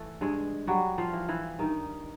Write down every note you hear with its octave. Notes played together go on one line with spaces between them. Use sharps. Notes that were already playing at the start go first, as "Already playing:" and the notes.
Already playing: E3 A3 A4
G2 G#3 G#4
F#3 G3 F#4
F3 F4
E3
E3 E4
G2 D#3 D#4